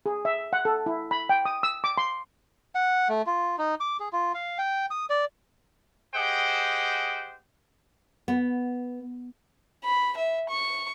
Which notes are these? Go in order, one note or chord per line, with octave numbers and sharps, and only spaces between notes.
G#4
E5
F#5
A4
E4
B5
G5
D#6
E6
D6
C6
F#5
A3
F4
D#4
D6
G#4
F4
F5
G5
D#6
D5
G4 G#4 C5 D#5 F#5 G5
B3
B5
E5
C#6